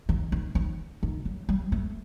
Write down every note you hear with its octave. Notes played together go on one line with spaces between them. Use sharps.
D#3
D#3
D#3
D#3
F#3
G3
A3